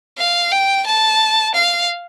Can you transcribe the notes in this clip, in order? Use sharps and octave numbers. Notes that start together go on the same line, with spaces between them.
F5
G5
A5
F5